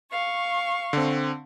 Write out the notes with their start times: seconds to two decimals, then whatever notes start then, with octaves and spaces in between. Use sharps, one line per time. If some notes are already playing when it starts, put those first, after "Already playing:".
0.10 F5 C#6
0.93 D3 C4